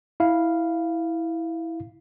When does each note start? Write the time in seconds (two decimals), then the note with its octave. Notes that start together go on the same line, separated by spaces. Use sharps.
0.20 E4 F5